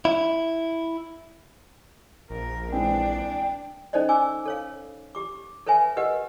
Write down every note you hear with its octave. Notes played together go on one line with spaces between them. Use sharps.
E4
A#1 A#4
E3 G#3 C4 D4 G5
C#4 D#4 A4 C5 D5 D#5
G#5 D6 E6
A4 C#5 F5
G4 D6
A4 B4 C#5 E5 G#5
G4 A#4 B4 D#5 F#5